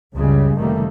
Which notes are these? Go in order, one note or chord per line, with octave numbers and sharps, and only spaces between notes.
C#2 F#2 C#3 G3 G#3
F#1 C3 D#3 G3 A3 A#3